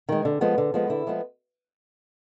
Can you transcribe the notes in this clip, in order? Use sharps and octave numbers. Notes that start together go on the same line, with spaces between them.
D#3 G#3
D3
F3 G#3 B3
D3
F3 G#3 B3
D3 E4
F3 G#3 B3